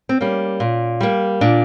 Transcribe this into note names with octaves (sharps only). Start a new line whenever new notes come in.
C4
G3 A#3 C#4
A#2
G3 A#3
A#2 D4